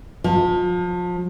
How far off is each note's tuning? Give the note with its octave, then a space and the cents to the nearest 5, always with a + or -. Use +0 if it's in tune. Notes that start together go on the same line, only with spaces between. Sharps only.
F3 +30